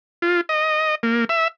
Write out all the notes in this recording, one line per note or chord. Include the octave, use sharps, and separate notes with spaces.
F4
D#5
A#3
E5